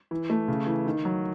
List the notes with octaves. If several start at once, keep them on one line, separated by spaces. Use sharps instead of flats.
E3
A3
C#3
E3
D#3
F#3